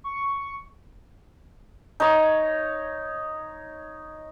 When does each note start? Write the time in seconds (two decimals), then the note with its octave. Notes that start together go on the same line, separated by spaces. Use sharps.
0.04 C#6
2.00 D#4 C#5